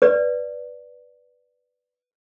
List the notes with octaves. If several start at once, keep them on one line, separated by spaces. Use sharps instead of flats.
B4 D5